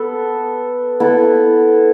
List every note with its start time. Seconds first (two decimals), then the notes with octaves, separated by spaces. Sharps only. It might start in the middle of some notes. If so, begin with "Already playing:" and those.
Already playing: B3 A4
1.00 B3 E4 A4